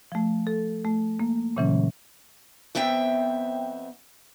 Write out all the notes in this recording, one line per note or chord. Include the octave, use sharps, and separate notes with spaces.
F3 A3
A4
A3
A#3
A#2 C#3 E3 F#3 C#4
F2 B3 C4 E5 G5